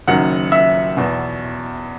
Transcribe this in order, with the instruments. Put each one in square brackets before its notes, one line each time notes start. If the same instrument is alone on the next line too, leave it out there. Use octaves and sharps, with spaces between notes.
[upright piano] F#1 F#2 D#3 F#5
E5
E2 B2